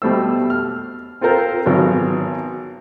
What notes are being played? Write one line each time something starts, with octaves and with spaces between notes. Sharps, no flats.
B2 G3 A3 C5 E6
F6
C4 F4 A4 A#4 C5
G#1 F#3 B3 F4